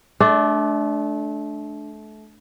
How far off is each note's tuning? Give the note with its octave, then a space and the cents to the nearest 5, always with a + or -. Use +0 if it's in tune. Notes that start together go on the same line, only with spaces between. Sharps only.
A3 -30 D4 +0